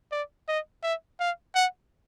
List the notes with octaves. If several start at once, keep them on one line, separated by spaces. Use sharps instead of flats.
D5
D#5
E5
F5
F#5